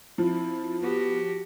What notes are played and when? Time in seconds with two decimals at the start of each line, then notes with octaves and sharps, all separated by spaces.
0.18 F3 C4 E4
0.81 B3 F#4 G4